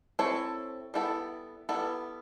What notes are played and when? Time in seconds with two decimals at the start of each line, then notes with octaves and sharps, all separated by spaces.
0.19 C4 E4 A4 C#5
0.94 G3 B3 E4 A4
1.69 G3 B3 E4 A4